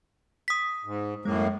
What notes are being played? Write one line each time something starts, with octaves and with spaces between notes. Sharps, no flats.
D#6 B6
G#2
F#2 A2 G#3 A#3